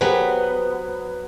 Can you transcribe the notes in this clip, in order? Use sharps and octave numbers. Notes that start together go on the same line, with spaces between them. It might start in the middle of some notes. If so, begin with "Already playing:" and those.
F#3 B3 G4 G#4 B4 C5